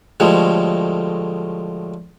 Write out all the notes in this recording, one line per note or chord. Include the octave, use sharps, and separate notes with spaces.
D2 A2 F3 G3 G#3